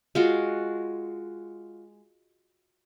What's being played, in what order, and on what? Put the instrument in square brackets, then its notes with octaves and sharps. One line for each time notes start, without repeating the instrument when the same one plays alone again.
[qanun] G#3 F4 F#4